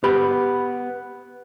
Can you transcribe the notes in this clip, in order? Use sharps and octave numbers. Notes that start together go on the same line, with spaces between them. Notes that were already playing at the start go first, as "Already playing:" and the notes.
B3 G4 B5